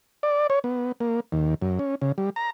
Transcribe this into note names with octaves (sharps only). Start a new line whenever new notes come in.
D5
C#5
B3
A#3
D#2
F#2
C#4
C#3
G3
A#5